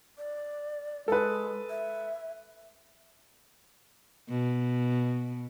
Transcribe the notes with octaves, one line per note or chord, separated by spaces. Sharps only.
D5
G#3 A4 B4
E5
B2